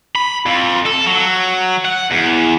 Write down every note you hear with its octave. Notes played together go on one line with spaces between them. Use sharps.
B5
F2
A4
F#3
F#5
E2